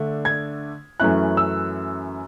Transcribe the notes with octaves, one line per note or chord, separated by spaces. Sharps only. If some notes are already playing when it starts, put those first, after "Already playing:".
Already playing: D3 A3 D4
G#6
F#2 E3 A3 C#4 E4 F#6
E6